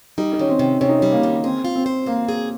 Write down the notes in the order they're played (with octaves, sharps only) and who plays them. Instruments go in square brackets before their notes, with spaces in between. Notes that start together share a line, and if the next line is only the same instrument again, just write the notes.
[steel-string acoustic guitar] G3 [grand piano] D#4
[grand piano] D#4
[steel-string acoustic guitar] D#3 [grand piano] C#4
[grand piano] C4
[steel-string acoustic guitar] C3
[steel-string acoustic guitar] C3 [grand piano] C#4
[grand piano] D#4
[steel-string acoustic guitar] G3 [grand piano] C#4
[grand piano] A#3
[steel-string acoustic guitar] D#3
[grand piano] C4 [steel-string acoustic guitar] G#4
[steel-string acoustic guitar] F4
[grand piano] C4
[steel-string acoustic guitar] C5
[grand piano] A#3 [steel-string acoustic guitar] C4
[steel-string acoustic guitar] G#4